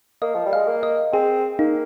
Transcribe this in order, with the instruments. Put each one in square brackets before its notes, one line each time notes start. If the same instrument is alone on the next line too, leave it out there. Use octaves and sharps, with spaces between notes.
[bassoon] A#3 [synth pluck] D#5
[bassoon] F3
G3
[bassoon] G#3 [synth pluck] F5
[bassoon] A#3
[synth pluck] D#5
[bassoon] C4 [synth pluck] G#4
[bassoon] A#3 [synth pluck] D#4